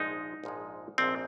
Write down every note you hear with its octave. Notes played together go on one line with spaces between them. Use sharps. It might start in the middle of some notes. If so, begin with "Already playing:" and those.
Already playing: A#1 G#2 F3 G#3 D#4
A#1 G#2 F3 G#3
A#1 G#2 F3 G#3 C4